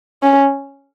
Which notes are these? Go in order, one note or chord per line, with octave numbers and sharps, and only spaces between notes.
C#4